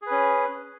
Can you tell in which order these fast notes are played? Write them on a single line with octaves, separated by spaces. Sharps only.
G#4 B4 C#4